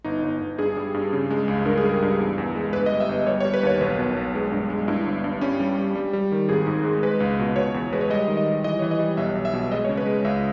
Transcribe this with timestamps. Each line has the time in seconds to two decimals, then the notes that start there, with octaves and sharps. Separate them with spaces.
0.04 G1 D#4
0.22 G1
0.41 G1
0.58 G2 G#4
0.77 G3
0.94 G2
1.13 C#3
1.30 G#3
1.48 C#2
1.66 G2 A#4
1.77 G#4
1.84 G3 A#4
2.02 G2
2.19 E2
2.38 E2
2.55 G#3
2.73 G1 B4
2.86 D#5
2.91 G3
3.00 E5
3.09 G1
3.26 G3 C#5
3.40 C#5
3.45 G3
3.54 B4
3.63 D#2 C#5
3.81 B1 B4
3.99 B2
4.16 B1
4.35 G#3
4.52 G2
4.70 G#3
4.88 G2 E4
5.06 G1
5.24 G2
5.41 G3 C#4
5.60 G3
5.78 G3
5.95 G3
6.13 G3
6.32 D#3
6.49 G#1 G#4
6.67 G#2
6.85 G#3
7.03 G#3 B4
7.20 C#2
7.39 B2
7.56 B2 C#5
7.74 E2
7.92 G#3 B4
8.01 C#5
8.10 G3 D#5
8.28 D#3
8.37 D#5
8.46 G3
8.64 E3 D#5
8.79 E3 C#5
8.91 D#5
8.99 G3
9.17 B1 E5
9.35 B1
9.45 E5
9.54 B2
9.72 G#3 D#5
9.85 C#5
9.89 C#3
9.97 B4
10.06 G#3
10.25 C#2 E5